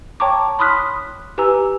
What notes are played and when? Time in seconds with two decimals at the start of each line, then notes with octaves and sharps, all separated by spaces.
0.20 C#5 G5 A5 A#5 C#6 D6
0.59 B5 C6 D#6 F6 F#6 B6
1.38 G4 B4 G#5 A#5 E6